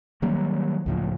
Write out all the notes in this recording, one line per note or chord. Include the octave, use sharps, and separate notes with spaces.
D#3 F#3 G3 A#3
C#2 A2 F3